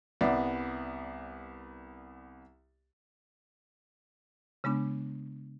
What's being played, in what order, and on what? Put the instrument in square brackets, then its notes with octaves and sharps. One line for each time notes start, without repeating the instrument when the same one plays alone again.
[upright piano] C2 B3 D5
[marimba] C#3 G#3 B3 D4